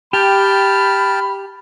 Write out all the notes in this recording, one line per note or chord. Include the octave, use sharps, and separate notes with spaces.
G4 G5 A5 B5 F6